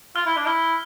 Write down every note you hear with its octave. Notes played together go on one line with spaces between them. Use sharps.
F4 F6
E4
D4
E4 F6